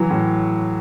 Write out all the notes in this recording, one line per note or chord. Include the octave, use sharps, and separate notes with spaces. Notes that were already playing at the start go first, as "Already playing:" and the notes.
Already playing: E3 F#3
A2